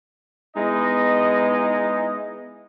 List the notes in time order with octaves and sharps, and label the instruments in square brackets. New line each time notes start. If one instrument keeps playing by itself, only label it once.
[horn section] G#3 B3 D#4 E4 D#5